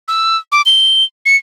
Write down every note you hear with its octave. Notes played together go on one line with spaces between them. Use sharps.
E6
D6
G7
C#7